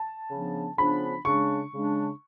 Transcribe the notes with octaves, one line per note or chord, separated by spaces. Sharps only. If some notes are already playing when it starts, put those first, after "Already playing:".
Already playing: A5
C#3 F3 B3 D4
C#3 F3 B3 D4 B5
C#3 G#3 D4 C#6
C#3 G#3 D4